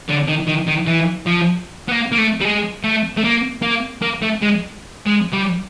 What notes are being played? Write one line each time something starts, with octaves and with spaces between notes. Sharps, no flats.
D3
D#3
D#3
D#3
E3
F3
B3
A#3
A#3
A3
G3
G#3
A3
A3
A#3
A#3
A#3
A3
G#3
G#3
G3